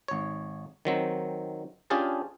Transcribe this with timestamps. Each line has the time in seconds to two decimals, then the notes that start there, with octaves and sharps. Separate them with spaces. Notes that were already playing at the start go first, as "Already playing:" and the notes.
0.08 G#1 C#5
0.85 D#3 F#3 C4
1.90 C#4 D4 F4 G4 G#4 A5